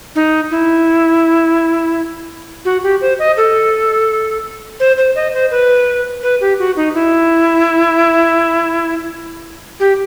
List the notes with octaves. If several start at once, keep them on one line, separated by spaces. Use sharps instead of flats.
D#4
E4
F#4
G4
C5
D#5
A4
C5
C5
D#5
C5
B4
B4
G4
F#4
D#4
E4
G4